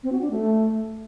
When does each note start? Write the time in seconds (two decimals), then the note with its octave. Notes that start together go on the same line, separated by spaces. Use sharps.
0.03 C4
0.12 F#4
0.21 D4
0.30 A3